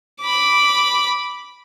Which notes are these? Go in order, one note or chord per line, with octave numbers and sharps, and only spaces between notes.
B5 D6